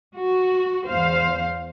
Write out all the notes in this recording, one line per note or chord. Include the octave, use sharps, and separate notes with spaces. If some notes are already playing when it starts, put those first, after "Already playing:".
F#4
E2 C5 F5